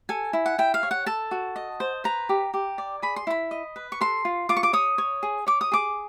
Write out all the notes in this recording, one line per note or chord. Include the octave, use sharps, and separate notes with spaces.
A4 G#5
E4
F#5
E4 G5
F5
C#5
F#5
A4 A5
F#4
D#5
C5
B4 A#5
G4
G4
D5
G#4 B5
C6
E4 B5
D#5
B4
C#6
A4 C6
F4
F4 D6
C#6
D6
C#5 D#6
C#5
G#4
C#5 D6
D#6
G#4 D6